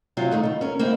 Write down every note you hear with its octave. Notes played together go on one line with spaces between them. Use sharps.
C3 F#3 F4
D#3 A3 D#4
B2 F4
C#4 A#4
A#3 C4 D#4 E4